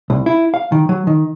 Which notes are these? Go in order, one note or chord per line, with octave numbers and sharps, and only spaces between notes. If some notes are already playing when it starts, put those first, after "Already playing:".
C2
E4
F5
D#3
F#3
D#3